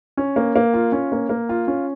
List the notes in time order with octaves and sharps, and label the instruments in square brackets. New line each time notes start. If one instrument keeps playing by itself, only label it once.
[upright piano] C#4
A#3
A#3
F4
C#4
A#3
A#3
F4
C#4